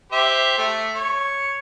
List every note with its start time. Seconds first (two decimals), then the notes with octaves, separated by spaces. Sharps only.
0.12 G4 C5 E5
0.58 A3
0.95 C#5